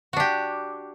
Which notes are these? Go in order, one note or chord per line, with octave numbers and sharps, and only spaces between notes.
D4 F#4 G4